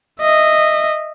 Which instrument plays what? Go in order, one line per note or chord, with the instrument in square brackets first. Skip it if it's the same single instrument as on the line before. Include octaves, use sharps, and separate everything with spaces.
[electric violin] D#5 E5